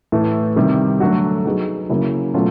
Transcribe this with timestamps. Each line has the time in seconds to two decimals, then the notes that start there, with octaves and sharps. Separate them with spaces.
0.12 A2 E3 A3
0.56 C3 D#3 G3
1.00 D3 F#3 A3 D4 F#4
1.45 F#3 B3 D#4 G#4
1.89 C#3 F#3 A#3 C#4 E4
2.34 B2 F#3 A3 C#4 F4